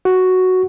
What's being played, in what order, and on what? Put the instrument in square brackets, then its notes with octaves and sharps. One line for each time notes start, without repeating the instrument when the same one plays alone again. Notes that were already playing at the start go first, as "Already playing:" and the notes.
[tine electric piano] F#4